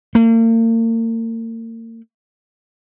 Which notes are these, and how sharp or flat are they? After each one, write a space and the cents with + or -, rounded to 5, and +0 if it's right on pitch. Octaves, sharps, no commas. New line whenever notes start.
A#3 -40